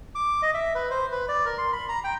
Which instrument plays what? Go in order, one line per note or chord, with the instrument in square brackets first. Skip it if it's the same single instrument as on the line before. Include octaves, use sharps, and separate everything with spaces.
[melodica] D6
D#5
E5
B4
C5
B4
D5
A#4
C6
B5
A#5
G5